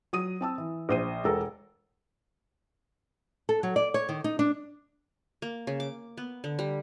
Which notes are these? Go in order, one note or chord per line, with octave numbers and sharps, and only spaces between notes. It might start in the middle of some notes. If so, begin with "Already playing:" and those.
F#3 D#6 D#7
C4 A5 E6
E3
A#1 C5 D#7
E1 A4 A#4
A4
F#3
D5
C#5
D#3
D#4
D4
A#3
C#3
D6
B3
D3
G3